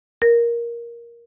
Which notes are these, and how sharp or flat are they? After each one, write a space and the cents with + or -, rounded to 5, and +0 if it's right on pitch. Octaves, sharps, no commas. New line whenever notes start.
A#4 +10